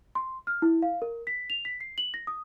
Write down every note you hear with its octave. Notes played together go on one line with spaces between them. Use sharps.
C6
F6
E4
F5
A#4
B6
F7
B6
C7
F#7
A#6
D#6